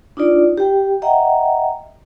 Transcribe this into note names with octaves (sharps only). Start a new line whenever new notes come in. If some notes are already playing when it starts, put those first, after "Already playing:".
D4 D#4 F4 D5
G4 G5
D#5 E5 F#5 G5 A#5